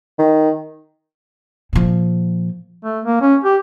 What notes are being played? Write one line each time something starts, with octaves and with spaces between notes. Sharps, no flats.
D#3
A#2 F3
A3
A#3
C#4
G4